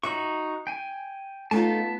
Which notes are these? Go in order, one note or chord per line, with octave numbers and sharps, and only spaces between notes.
D#4 F#4 E5 C#6
G5 G#5
A3 B3 D#4 F4 A5